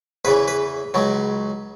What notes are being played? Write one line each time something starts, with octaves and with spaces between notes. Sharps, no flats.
E2 C#3 E3 B4
B4
C#2 C#3 F#3